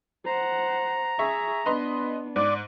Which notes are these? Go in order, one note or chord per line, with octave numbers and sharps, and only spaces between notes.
C5 F#5 A#5
G#4 E5 C#6
B3 D4 B4 D#5 C6
G#2 D5